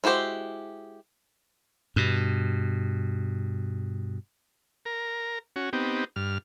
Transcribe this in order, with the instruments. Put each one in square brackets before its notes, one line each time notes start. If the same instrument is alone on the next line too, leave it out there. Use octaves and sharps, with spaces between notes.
[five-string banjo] G#3 E4 F#4 G4 C5
[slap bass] G2 B2
[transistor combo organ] A#4
C#4 F#4
B3 C4 D#4 G4
G2 F6